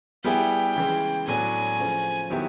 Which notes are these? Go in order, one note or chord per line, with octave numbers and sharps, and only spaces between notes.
G3 B3 E4 G#4 G5
C#3 E3 G#3
A2 F#3 B3 D4 G#5
C#3 F3 A3
D#3 F#3 B3 E4 G4